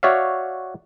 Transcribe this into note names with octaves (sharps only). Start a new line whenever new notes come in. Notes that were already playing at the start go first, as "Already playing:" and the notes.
F#4 C#5 D5 E5 F5